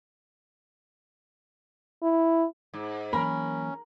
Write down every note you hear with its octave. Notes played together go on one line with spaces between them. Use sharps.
E4
G#2
E3 F#3 A#3 C#4 A#4 B5